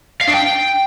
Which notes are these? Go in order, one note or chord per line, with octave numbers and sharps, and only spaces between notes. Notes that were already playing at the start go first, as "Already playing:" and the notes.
F5
D4
G5